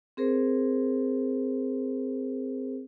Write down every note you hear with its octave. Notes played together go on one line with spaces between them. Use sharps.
C4 G#4 A#4 C5